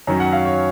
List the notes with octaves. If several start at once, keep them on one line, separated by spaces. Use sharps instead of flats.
F#2 D#3 F#3 C#4 A#5
F#5
F5
C#5